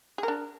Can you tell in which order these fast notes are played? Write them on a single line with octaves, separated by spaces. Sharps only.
G#4 A#4 D4